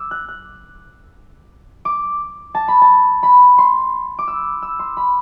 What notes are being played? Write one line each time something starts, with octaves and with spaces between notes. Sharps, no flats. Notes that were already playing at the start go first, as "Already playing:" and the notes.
Already playing: D6 E6
F#6
F#6
D6
A5
B5
A5
B5
C6
D6
E6
E6
C6
B5